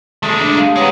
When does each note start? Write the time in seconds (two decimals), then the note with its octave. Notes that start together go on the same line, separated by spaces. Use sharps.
0.23 G#3 A3
0.40 D4
0.57 G4 F5
0.76 G#3 B3 C#5 F#5 A#5